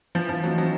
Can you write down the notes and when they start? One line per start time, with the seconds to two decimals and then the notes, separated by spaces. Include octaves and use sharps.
0.15 E3 F3
0.29 F3
0.43 F#3 A3 C4 D#4
0.58 F#3